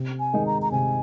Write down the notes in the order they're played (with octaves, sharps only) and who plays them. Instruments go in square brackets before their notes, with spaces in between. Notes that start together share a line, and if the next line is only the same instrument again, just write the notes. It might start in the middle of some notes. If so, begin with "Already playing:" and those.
Already playing: [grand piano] C3
[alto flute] G#5
[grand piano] D#3 G#3 D#4
[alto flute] A#5
A#5
[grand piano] C3 [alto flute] G#5